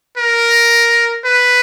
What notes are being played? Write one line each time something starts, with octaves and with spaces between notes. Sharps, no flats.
A#4
B4